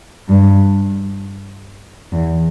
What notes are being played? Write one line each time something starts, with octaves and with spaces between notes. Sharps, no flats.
G2
E2